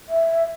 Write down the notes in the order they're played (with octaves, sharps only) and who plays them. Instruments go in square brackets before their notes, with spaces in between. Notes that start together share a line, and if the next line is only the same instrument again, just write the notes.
[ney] E5